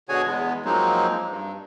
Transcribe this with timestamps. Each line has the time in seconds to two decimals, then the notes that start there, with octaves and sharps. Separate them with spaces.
0.09 B2 D3 F#4 G#4 C#5 G#5
0.26 E2 G#3 B3
0.65 F3 F#3 G#3 A#3 C4 D#4
1.29 G2